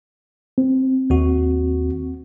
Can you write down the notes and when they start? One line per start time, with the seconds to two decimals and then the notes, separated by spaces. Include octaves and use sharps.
0.58 C4
1.10 D#2 F#4